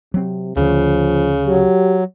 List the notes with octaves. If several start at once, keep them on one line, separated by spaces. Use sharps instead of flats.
C3 F#3 C4
D2 C#3 F3
F#3 G4